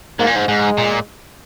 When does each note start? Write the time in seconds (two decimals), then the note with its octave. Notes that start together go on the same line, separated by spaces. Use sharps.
0.19 G#2 A#3
0.27 A#2
0.35 G#2
0.48 G#2 G#3
0.78 A#2